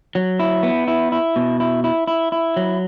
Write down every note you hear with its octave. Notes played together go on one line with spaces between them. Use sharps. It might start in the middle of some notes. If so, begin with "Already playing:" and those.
F#3
E4
B3
E4
E4
B2
E4
E4
E4
E4
F#3